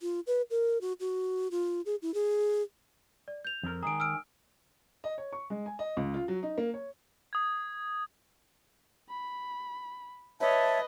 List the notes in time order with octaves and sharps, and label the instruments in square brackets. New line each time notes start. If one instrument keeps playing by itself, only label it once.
[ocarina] F4
B4
A#4
F#4
F#4
F4
G#4
E4
G#4
[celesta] D5
G6 F7
[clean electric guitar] F2 A#4
[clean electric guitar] D#3 G#3 G#4 [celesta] A#5 D7
[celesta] E6 F6 D7
[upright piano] D#5
C#5
C#6
G#3
G#5
D#5
C#2
F4
F#3
D#4
A#3
C#5
[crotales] D#6 G#6
[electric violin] B5
[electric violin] B4 D#5 [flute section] C#5 E5 A5